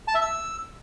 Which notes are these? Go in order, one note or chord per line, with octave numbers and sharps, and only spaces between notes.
A5
E5
E6